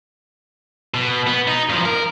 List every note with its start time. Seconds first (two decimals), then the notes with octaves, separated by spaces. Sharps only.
0.94 B2
1.27 B3
1.47 D#4
1.69 G2 F3
1.85 A#4